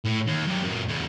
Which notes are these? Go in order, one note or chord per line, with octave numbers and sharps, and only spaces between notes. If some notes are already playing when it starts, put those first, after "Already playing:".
A2
D#2
F#2 G4
F#2 A#2
E2 C#3